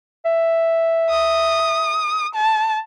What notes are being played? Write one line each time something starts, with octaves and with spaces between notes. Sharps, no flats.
E5
D#6
A5